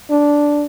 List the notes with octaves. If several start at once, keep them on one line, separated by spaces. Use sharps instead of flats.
D4